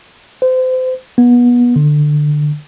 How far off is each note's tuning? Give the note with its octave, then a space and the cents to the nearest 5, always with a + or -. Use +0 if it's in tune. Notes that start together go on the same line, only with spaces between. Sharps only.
C5 -30
B3 -25
D3 +15